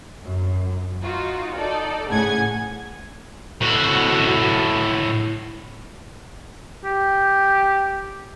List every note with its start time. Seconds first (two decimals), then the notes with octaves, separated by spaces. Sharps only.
0.23 F#2
1.03 D#4 F4 F#4
1.55 D#4 A4 D5
2.09 A2 C#3 F#5 G#5 G#6
3.61 A2 F#4
6.85 G4